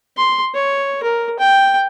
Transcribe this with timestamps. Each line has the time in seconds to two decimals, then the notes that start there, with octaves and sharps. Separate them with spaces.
0.17 C6
0.54 C#5
1.03 A#4
1.39 G5